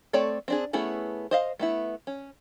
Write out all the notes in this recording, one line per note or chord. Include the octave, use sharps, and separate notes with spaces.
A3 C4 A4 C#5 D5
C4 D4 G#4
A3 B3 C#4 E4 G#4
C5 D#5 F5
A3 B3 E4
C#4